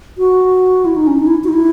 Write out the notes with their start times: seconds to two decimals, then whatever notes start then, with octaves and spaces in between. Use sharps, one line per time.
0.18 F#4
0.85 E4
0.96 D#4
1.07 C#4
1.19 D#4
1.27 E4
1.44 F#4
1.48 D#4
1.53 E4